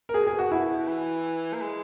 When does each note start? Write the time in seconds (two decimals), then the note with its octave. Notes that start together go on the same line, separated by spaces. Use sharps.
0.09 A#4
0.14 B2 G#4
0.27 G#4
0.39 F#4
0.51 E4
0.88 E3
1.53 A#3
1.62 G#3